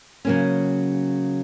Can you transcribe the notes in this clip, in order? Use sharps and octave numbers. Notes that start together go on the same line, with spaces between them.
C#3 F#3 A#3 C#4